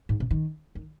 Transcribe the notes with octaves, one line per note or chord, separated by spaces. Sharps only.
G#2
C3
D#3
D#3